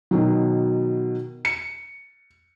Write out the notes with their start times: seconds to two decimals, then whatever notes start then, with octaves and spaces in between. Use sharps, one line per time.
0.11 B2 D#3 F#3
1.45 C#7